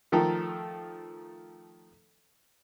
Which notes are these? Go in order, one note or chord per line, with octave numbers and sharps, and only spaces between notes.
D#3 F3 A3 A4 A#4